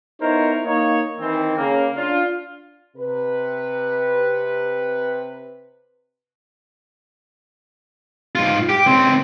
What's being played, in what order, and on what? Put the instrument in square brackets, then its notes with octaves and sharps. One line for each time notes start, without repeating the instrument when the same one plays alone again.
[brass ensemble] B3 D#4 E4 A#4 C5 C#5
A#3 D#4 C#5
D#3 E3 C4
C#3 A#3
D4 F4
[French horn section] C3 B4
[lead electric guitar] G#2 F4
G4
C#2 C4